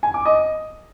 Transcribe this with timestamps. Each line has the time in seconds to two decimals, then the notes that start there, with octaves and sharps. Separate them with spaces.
0.03 G#5
0.14 D6
0.25 D#5